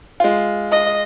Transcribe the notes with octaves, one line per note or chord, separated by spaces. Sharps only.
G#3 F4
D#5